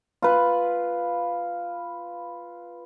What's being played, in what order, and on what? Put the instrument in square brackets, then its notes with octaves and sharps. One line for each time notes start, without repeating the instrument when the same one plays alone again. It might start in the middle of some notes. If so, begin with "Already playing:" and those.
[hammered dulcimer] F4 B4